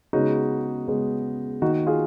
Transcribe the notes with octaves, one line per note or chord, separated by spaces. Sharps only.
C#3 G#3 B3 D#4 F#4
C#3 G#3 B3
D#3 A#3 D#4 F#4
F4 G#4